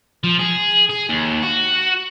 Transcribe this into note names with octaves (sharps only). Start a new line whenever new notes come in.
F3
G#4
G#4
D#2
F#4